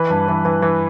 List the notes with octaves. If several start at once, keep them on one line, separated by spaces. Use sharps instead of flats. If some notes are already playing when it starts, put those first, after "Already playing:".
Already playing: E3 B4
G2
E3
E3
E3